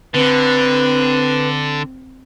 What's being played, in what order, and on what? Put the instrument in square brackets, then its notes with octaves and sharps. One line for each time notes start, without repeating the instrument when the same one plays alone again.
[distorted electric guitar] D3 [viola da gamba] C4 [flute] B4